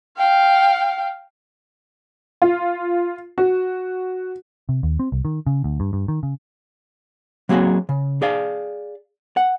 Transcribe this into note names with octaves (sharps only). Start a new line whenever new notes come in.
F5 G5
F4
F#4
C3
D#2
C4
C2
D#3
C#3
D2
G2
G2
D#3
C#3
F#3 A#3 C4 F4 F#4 G#4
C#3
G#4 D5 F5
F#5